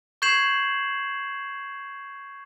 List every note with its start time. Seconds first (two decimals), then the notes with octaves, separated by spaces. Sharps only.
0.22 C#6 G6 G#6 C7 E7 F#7